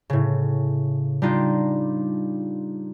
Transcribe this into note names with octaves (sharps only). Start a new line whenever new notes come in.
A2 C#3
G3 D4 D#4 F4